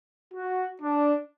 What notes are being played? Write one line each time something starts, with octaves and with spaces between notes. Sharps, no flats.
F#4
D4